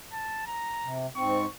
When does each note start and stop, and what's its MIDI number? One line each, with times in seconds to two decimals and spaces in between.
0.12 0.43 81
0.46 0.96 82
0.83 1.07 48
1.16 1.46 44
1.16 1.46 60
1.16 1.50 85